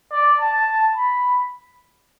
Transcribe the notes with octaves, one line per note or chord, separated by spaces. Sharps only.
D5
A5
B5